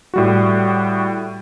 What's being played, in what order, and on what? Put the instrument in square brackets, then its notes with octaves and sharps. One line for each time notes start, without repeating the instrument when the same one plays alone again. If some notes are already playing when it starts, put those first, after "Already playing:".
[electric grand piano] A2 G3 F#4